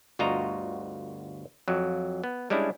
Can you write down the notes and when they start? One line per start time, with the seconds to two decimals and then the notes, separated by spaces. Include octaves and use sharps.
0.19 G1 D2 F4 F#4 D#5 A#5
1.68 F2 F#3
2.24 B3
2.50 G3 G#3 C#4 D4 E4